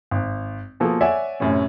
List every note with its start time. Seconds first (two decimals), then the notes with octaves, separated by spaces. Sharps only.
0.11 G#1
0.80 B2 F3 A#3 G#4 A4
1.01 C#5 D5 E5 F#5 G#5
1.40 F#2 A2 C3 C#4